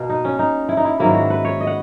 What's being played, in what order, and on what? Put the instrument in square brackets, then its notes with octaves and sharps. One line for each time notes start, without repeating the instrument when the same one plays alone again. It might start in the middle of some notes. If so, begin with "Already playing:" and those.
Already playing: [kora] B2 A#3
D#4
C#4
D#4
E4
D#4
E4
G#2 D#3 F#3 A#3 E4
F#4
B4
C#5
D#5
F#5